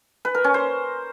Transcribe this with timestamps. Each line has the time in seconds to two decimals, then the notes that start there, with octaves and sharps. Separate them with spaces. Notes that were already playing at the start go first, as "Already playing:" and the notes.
0.25 B4
0.35 A#4
0.44 C#4
0.54 C5